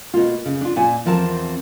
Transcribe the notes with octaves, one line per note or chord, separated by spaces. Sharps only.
B2 A#3 F4
C#3
D4 F4
A#2 G#5
E2 F3 C4 A#4 A5